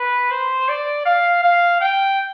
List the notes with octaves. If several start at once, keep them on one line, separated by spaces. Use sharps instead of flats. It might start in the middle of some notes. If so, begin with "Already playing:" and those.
Already playing: B4
C5
D5
F5
F5
G5